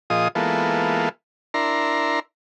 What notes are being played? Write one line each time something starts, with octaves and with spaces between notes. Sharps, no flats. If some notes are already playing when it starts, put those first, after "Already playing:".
A#2 F3 F4 G#4 D#5 D#6
E3 G#3 A#3 B3 F4 A4
D4 E4 A#4 A#5 C6